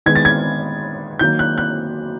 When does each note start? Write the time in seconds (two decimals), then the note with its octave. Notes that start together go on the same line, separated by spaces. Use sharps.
0.06 D#3 G#3 B3 G#6
0.15 A6
0.25 G#6
1.19 D#3 F#3 A#3 G6
1.39 F#6
1.58 F#6